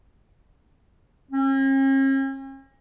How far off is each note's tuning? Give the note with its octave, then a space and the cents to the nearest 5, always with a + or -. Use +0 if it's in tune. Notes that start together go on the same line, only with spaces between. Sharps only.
C#4 -45